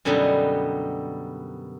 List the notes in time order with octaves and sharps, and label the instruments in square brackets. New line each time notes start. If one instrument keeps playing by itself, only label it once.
[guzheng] F#2 B2 D3 G3 B3 D#4